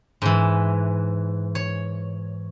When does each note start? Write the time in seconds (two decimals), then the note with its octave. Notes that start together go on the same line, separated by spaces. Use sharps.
0.22 G#2 E3
1.55 C#5